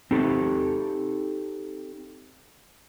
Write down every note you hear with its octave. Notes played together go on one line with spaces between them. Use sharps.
C4 D#4 G4 A4